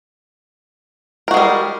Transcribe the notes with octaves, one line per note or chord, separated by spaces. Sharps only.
G3 G#3 F#4 A#4